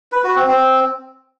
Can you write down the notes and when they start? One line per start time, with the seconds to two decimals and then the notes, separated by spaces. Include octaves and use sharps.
0.12 B4
0.24 F#4
0.36 C4
0.48 C4